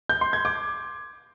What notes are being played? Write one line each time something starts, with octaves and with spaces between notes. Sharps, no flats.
G6
C6
G#6
D6